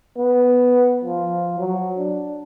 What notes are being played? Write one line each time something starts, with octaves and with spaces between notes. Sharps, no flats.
B3
F3
F#3
D4